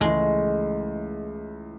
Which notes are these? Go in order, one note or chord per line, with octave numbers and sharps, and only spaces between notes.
C#2 C#3 E3 G#3 A3 E4